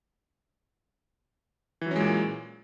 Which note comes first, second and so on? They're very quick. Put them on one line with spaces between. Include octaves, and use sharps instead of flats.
E3 F#3 C#4 G#3 A#2